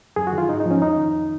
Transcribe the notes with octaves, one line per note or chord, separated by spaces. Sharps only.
F#2 G#4
F#4
D#3
F4
G#2 D#4
D#4
F3 C#4
F2 D#4
D#3